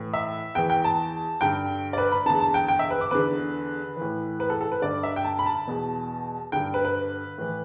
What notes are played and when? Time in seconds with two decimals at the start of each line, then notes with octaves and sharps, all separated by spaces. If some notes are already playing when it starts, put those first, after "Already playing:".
Already playing: A2 E3
0.13 E5
0.55 E2 E3 G5
0.70 G5
0.84 A5
1.41 G2 D3 G5
1.93 D5
1.98 B4
2.12 B5
2.26 E2 D3 A5
2.40 A5
2.54 G5
2.68 G5
2.79 E5
2.90 B4
3.01 D6
3.11 E2 D3 B4
3.97 A2 E3
4.40 B4
4.50 A4
4.61 A4
4.72 B4
4.82 G2 D3 D5
5.03 E5
5.16 G5
5.24 A5
5.39 B5
5.46 A5
5.67 E2 B2
6.52 G2 D3 G5
6.74 B4
6.85 B4
7.38 A2 E3